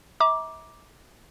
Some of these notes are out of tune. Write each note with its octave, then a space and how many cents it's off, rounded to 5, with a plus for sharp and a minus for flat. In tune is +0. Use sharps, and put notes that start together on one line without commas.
E5 -40 A#5 +25 D6 +0